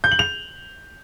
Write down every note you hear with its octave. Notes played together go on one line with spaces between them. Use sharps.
G6
F#7
F7